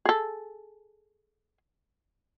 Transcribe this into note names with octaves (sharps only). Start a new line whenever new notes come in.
G#4 A4